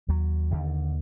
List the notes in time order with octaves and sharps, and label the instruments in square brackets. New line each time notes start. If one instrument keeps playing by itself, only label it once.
[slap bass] D#2 F#3
D#2 D3